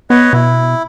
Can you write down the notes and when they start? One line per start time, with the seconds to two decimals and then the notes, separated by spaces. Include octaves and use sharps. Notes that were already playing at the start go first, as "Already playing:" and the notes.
0.10 B3 B4 C#5 D#5
0.33 B2 E4